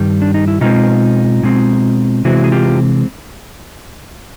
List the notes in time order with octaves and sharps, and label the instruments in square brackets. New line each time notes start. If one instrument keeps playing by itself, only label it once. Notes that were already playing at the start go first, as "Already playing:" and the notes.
Already playing: [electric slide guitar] G2 D#3 G3
D4
D#4
E4
B2 G#3 C4 D#4 F4
B2 G#3 C4
C3 E3 G#3 C4 E4 F#4
G#4
F4 G4